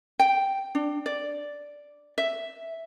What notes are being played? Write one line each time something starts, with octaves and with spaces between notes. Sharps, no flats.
G5
D4
D5
E5